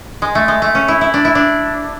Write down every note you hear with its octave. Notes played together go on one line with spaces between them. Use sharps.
G#3
A3
G#3
A3
C#4
E4
E4
D4
E4
D4